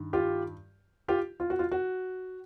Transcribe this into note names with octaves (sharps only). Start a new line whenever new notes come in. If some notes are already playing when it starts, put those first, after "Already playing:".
Already playing: G2 D#3
F4 G4
F4 G4
F4
F#4
F4
F#4